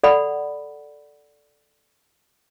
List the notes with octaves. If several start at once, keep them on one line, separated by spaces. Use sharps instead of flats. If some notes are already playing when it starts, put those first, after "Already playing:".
A4 D5 F#5 B5